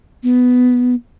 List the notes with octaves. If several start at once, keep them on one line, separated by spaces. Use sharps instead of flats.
B3